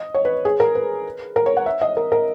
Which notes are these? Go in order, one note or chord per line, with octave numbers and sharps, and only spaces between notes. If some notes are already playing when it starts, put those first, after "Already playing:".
Already playing: D#5
C#5
B4
G#4
A#4
B4
A#4
C#5
F#5
E5
D#5
A#4
A#4